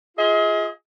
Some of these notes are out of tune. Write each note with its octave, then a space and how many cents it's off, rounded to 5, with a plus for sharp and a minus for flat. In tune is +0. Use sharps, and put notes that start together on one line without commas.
F4 +0 G#4 +0 D#5 +40